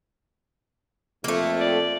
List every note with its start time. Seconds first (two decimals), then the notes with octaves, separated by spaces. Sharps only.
1.24 F2 A3 A#3
1.61 D5